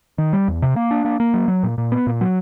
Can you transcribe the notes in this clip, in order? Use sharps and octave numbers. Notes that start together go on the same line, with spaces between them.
D#3
G3
E2
C3
A#3
D4
A#3
A#3
F#3
F#3
A#2
A#2
B3
A#2
F#3